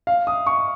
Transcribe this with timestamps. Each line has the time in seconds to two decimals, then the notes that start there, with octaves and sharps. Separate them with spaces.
0.07 F5
0.27 D#6
0.47 C#6